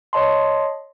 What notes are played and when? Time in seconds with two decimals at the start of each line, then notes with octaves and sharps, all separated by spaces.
0.13 C#5 D#5 A5 C6